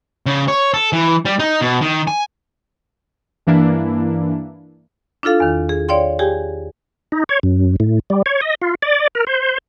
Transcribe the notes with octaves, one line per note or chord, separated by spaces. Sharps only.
C#3
C#5
A4
E3
G3
D#4
B2
D#3
G#5
G2 E3 A#3 D4 E4
D4 E4 F4 A4 F5
E2 D#3
G#4
C#5 D5 F5 G5 C6
G4 G#4 G5 G#5
D#4
C#5
F#2
A2
G3
C#5
D#5
F4
D5
A#4
C5